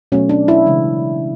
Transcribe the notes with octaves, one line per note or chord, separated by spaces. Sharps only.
B2 F#3 A3 C#4
D4
E4
C#3 E3 G#3